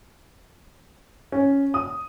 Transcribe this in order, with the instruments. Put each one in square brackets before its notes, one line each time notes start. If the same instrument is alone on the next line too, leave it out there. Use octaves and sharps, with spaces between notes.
[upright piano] C#4
D#6